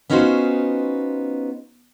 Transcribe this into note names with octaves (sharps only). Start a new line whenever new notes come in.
B3 C#4 D#4 F4 F#4 C5